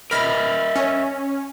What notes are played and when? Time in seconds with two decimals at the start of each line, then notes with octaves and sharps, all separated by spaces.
0.11 A#4 D#5 E5 B5 F6
0.76 C#4